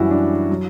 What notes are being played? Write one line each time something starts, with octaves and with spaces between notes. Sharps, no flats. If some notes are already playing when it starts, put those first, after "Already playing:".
Already playing: F#2 E3 G3 E4 F#4
D4
F#3